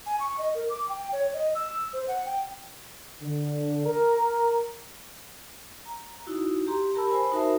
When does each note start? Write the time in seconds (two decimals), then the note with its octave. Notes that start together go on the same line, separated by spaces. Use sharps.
0.06 G#5
0.20 C#6
0.38 D#5
0.55 A#4
0.69 D6
0.89 G5
1.12 C#5
1.34 D#5
1.55 E6
1.93 C5
2.08 F#5
2.26 G5
3.21 D3
3.86 A#4
5.86 A#5
6.26 D#4 E4 F#4
6.67 G4 A#5 C6
6.95 G4 A#4 A5 B5 E6
7.11 C5 G#5 B5
7.32 D#4 F#4 A#4 C5 E5 A5